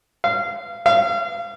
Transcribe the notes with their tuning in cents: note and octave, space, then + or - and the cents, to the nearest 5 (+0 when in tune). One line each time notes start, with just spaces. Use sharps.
F5 -25
F5 -35